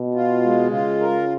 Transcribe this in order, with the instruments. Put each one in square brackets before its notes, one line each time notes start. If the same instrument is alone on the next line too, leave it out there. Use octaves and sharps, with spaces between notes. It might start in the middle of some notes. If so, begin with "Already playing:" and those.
Already playing: [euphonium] B2
[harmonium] F4
G#3
[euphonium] C#3 [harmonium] F4
[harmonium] A#4